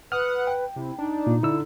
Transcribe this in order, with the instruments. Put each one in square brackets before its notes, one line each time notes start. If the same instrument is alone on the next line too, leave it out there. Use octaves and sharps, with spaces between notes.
[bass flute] B4 [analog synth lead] F#5 [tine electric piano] D#6 F6
[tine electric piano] G5
[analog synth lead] C3 [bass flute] E4
[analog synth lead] D4 [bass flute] D#4
[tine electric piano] A#2
[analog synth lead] D3 [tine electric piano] E4 E6